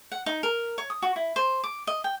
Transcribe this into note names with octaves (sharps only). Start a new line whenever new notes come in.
F#5
D#4
A#4
C#5
D#6
F#4
E4
C5
D6
D#5
G5